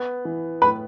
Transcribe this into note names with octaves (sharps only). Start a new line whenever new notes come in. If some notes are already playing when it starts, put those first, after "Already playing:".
Already playing: B3
E3
A2 B4 B5